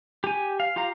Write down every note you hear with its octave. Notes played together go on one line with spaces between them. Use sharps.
G4 G#5
F5
F4 G4 F5 A#5